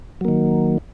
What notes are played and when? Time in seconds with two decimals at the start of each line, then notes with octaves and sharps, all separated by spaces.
0.21 F#3
0.25 A#3
0.28 D#3